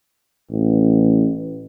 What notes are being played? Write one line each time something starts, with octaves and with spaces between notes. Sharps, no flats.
A1